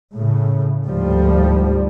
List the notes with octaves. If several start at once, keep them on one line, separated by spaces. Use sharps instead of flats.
A2 C#3
D2 G#2 F3 G3